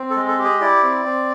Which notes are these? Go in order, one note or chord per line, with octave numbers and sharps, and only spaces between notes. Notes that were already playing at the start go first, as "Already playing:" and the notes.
Already playing: C4
A4
G#3
A4
G4
G#4
E4 D5
C4
C4